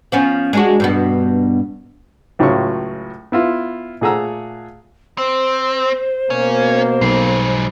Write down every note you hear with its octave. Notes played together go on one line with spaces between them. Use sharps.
F3 B3 C#4
G#3 D4 F#4
G2 B2 B3
C#2 A2 F#3 C#4 F4 C#6
B3 E4 F4
A#2 A3 G#4 F#5 A#5 E6
C4 C5
B2 A#3 C#4
B1 G#2 G3 C7